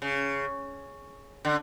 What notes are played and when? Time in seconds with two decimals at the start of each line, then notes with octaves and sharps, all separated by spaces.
0.02 C#3
1.45 D3